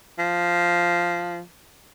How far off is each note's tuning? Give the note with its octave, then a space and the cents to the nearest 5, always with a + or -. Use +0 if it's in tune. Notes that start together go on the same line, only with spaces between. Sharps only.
F3 -5